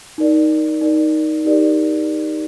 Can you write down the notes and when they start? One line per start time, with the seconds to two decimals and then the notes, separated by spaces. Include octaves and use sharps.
0.18 D#4 A#4 D5
0.81 D#4 A#4 D5
1.45 D#4 G4 A#4 D5